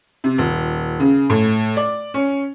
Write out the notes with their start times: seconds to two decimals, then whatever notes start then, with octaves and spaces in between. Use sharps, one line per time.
0.24 C3
0.38 D#1
1.00 C#3
1.30 A2
1.77 D5
2.14 C#4